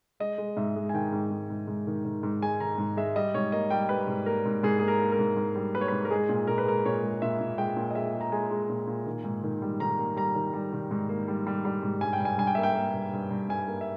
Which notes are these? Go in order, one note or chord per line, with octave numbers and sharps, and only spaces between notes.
G#3 D#5
G#3
G#2 E5
G#3
G#5
D#3 G5
G#2
G#2
G#2
G#2
D#3
D#3
G#2
G#3 G#5
D#3 A#5
G#2
G#3 E5
G3 D#5
G#2 C#5
A#3 D#5
G3 G5
G3 B4
G#2
A#3 A#4
G#2
G#2 G#4
A#3 G#4
A#4
A#3
A#4
G#2
G#2
G3
A#3 B4
C#5
G#2 B4
A#4
G#3 G#4
A#2
A#2 A#4
B4
G#3 A#4
A#2 C#5
G#3
A#2 E5
A#2
G#3 G5
A#2
D#5
G#3 E5
G#3
A#5
G#3 G#5
G#3
A#2
A#2
D#3
G#2
D#3
G3
D#3 A#5
A#3
G3 A#5
D#3
G3
D#3
G#2
A#3
G3
G3
G3
G#2
G2 G#5
G5
G2 G#5
G2 G#5
G5
A#3 E5
G5
A#3
G2
G2
G2
G2 G#5
A#3
E5